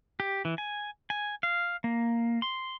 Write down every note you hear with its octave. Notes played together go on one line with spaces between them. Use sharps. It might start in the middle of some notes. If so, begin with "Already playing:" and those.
G4
E3
G#5
G#5
F5
A#3
C6